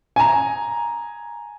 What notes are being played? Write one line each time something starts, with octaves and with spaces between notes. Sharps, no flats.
G#5 A#5